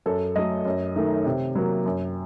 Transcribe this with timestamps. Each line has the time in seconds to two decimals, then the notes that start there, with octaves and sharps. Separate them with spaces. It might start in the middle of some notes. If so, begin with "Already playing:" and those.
0.06 F#2 A4
0.36 F#3 A3 D#5
0.65 F#2
0.96 D#3 A3
1.26 C3
1.55 F#3 A#3
1.86 F#2